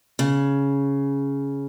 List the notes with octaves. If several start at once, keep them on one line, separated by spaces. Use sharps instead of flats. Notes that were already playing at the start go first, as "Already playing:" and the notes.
C#3